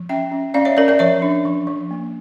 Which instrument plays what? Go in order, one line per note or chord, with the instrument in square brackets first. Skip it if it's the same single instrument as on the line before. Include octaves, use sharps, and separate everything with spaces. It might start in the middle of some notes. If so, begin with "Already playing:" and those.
Already playing: [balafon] F3
C#4 E5 G5
C#4
C#4 D5 F5
C#5 E5
C#4 A#4 D5
A#4 D5
F3 C#5 E5
D4
F3
F3
A#3